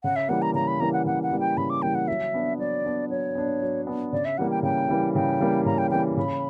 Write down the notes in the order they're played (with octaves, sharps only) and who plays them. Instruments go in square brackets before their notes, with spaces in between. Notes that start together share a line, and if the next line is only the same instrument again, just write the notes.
[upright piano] C#3 [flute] F#5
[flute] E5
[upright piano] E3 G3 A#3 [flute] F#5
[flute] A#5
[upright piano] C#3 [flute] A#5
[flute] B5
[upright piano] E3 G3 A#3 [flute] A#5
[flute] F#5
[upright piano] C#3 [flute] F#5
[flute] F#5
[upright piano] E3 G3 A#3
[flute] G5
[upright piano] C#3 [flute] B5
[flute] D6
[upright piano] E3 G3 A#3 [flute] G5
[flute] F#5
[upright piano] F#3 [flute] E5
[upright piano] B3 D4
[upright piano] F#3 [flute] D5
[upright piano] B3 D4
[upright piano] F#3 [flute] C#5
[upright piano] B3 D4
F#3
B3 D4
[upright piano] C#3 [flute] D5
[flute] E5
[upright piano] E3 G3 A#3 [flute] F#5
[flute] G5
[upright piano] C#3 [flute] G5
[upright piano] E3 G3 A#3
[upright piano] C#3 [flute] G5
[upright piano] E3 G3 A#3
[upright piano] C#3 [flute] A#5
[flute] G5
[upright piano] E3 G3 A#3 [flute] G5
[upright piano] C#3 [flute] B5